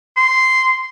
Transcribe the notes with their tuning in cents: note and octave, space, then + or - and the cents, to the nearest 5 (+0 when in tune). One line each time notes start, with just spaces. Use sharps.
C6 -10